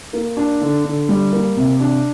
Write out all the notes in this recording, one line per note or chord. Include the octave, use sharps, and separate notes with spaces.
A#3
D4
D3
D3
G3
A#3
C3
D4